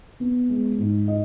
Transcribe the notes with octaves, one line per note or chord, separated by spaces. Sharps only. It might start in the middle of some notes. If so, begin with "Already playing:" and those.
B3
G#3
G#2
D#5